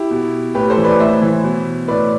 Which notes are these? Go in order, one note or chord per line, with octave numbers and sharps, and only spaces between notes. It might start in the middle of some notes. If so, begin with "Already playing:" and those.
Already playing: E4 G4
B2
A2 G4 B4
A4 C5
E3
B4 D5
A2 C5 E5
E3
B2
A2 B4 D5